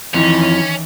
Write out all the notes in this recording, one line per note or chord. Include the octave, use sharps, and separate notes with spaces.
F2 D#3 E3 C#4 E4